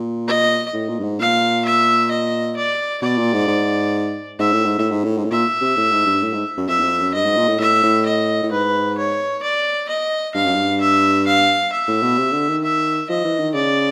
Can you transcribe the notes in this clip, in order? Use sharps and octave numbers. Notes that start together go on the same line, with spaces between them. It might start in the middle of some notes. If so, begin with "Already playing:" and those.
Already playing: A#2
D#5
A2
A#2
G2
G#2
A#2 F5
E5
D#5
D5
B2 D5
A#2
G#2
G#2
G#2 E5
A2
G#2
A2
G#2
A2
G#2
A2
A#2 E5
C3
A2
G#2
G2
A2
G#2
F#2
F2 E5
E2
F2
F#2
G2 D#5
G#2
A#2
A2
A2 E5
A2
D#5
A2
G#2 B4
C#5
D5
D#5
G2 F5
F#2
G2
E5
F5
E5
A2
B2
C3
D3
D#3
E5
F3 D#5
E3
D#3
C#3 D5